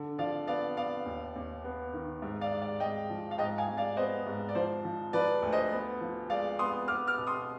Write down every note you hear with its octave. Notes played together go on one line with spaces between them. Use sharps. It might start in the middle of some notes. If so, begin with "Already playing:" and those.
Already playing: D3
F3 D5 F5
B3 D5 F5
B3 D5 F5
D#2
D#2
B3
D#3
G#2
D5 F5
G#2
D5 F5
G#2 D#5 G5
F3
F5
G#2 D#5 G5
F5 G#5
G#2
D5 F5
B3 C5 D#5
G#2
D5
F3 C5
F3
F3 B4 D5
D2
C5 D#5
B3
F3
G#3 D5 F5
B3 C6 D#6
B3 D6 F6
D6 F6
B2
C6 D#6